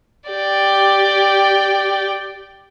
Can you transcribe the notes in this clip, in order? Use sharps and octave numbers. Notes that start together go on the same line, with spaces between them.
G4 D5 G5